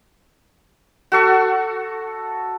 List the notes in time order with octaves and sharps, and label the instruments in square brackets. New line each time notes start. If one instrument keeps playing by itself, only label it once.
[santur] F#4 A4 C#6